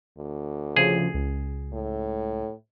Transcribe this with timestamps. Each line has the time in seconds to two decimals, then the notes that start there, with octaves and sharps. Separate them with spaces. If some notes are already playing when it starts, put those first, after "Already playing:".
0.18 D2
0.76 C#3 F3 G#4
1.14 C#2
1.73 A2